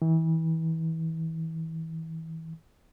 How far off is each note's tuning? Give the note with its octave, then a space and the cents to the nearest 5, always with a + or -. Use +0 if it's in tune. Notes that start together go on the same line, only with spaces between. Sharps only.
E3 -30